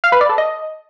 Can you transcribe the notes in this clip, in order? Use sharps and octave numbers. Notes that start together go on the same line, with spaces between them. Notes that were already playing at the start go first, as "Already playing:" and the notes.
F5
B4
D5
A4
D#5